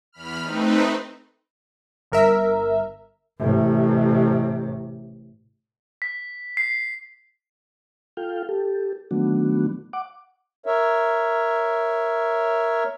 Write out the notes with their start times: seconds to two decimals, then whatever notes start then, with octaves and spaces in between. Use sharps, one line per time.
0.12 E2 B5 F6
0.43 A3 C4 D#4 B4
2.12 G1 A#4 E5
3.39 A1 C3
6.02 B6
6.57 C7
8.17 F4 A4 F5 G5
8.49 G4 A4
9.11 D#3 F#3 A3 B3 D4 F#4
9.93 F#5 D6
10.66 A#4 C#5 E5